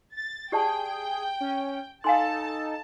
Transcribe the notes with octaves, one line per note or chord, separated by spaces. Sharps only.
A6
G4 G#4 D5 G5 A5
C#4
D#4 A4 F5 G#5 A5 C6